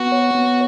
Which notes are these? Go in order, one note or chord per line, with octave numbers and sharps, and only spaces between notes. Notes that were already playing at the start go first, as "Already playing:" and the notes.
Already playing: B3 F#4
C#5
B3